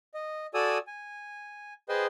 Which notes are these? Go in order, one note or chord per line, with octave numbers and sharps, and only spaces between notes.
D#5
F#4 A4 D5 G#5 D#6 E6
G#5
G#4 B4 C5 D#5 G5 C6